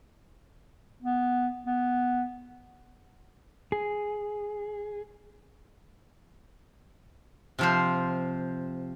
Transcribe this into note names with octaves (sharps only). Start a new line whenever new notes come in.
B3
B3
G#4
C3 F3 C5